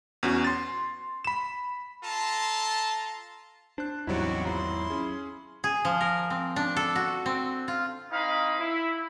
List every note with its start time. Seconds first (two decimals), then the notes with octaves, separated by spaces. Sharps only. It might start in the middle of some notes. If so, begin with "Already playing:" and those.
0.23 E2 C#4 F#4
0.45 C6 A6
1.25 B5 E7
2.04 F4 A4 A5 A#5 C6
3.78 D4 C5 F#6
4.07 A1 E2 C3 F#3 G3 D#4 E4 F#4
4.45 G#1 E4 F4 A#5 C6
4.90 C#4 G#4
5.64 G#4
5.85 F3
6.01 A#4
6.30 C4
6.56 D4
6.77 A4
6.96 F#4
7.26 C4
7.68 F4
8.10 C4 D#4 E4 F5 B5 D#6
8.58 E4